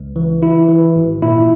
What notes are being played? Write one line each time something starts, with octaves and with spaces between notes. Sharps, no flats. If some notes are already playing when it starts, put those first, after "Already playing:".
Already playing: C#2
E3
E3 E4
E3
G#1
A#2 E4